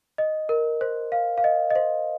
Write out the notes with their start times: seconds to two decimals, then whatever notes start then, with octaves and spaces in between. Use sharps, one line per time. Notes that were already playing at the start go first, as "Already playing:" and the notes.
0.18 D#5
0.49 A#4
0.81 C5
1.12 F5
1.38 F5
1.44 D#5
1.70 D#5
1.76 C5